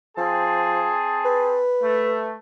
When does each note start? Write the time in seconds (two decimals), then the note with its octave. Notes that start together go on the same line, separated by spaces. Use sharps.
0.17 F3 C4 G#4 A5
1.25 B4
1.83 A3